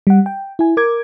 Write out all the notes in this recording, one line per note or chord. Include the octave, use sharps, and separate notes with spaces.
G3 F#5
G5
E4 G#5
A#4 D6 G#6